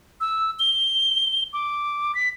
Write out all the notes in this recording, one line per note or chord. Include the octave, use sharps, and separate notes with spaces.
E6
G7
D6
B6